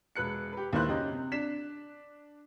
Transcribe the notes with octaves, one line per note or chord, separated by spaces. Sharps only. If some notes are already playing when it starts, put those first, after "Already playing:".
E1 B4 F#6 C#7
G4 B4
D#2 A#3 E4 C5 F#6
F#2 C#3 G4 D#5
C3
D4 B6 E7